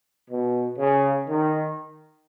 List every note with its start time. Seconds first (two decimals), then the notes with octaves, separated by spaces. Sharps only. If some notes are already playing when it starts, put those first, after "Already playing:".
0.30 B2
0.78 C#3
1.28 D#3